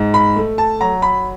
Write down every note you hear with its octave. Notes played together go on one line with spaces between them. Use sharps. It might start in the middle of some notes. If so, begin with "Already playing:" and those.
Already playing: G#2
B5
A3
A5
F#3 A#5
B5